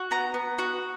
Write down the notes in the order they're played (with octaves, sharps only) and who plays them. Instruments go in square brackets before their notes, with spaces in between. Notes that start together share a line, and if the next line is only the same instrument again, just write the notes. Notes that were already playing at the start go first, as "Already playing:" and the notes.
Already playing: [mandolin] F#4
B3 A#5
B3
F#4